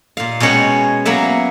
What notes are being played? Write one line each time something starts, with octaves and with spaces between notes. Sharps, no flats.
A#2 F5
B2 G#3 C#4 C#5 F#5 G5
F#3 A#3 B3 E5